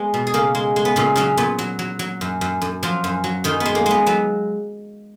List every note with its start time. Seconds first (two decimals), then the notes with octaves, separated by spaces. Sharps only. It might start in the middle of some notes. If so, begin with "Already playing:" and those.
Already playing: G#3 B3
0.14 B2
0.27 G#4
0.34 C#3 A#3 A#4
0.55 G#3
0.76 G#3
0.85 B3
0.96 A#2 C#3 C#4
1.16 C#3 F#3 C#4
1.37 A#2 B3
1.59 F#3
1.79 F#3
1.99 F#3
2.21 F#2
2.41 F#2
2.62 F#2
2.83 F3 F#3 F4
3.04 F#2
3.24 F#3
3.44 F#2 D#3 D#4
3.60 B3
3.65 G#3
3.75 A#3
3.86 G#3 B3
4.06 F#3 B3